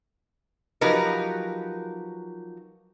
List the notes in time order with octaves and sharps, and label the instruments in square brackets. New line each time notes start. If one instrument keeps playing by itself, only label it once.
[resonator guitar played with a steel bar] F3 F#3 D#4 G4 A#4 B4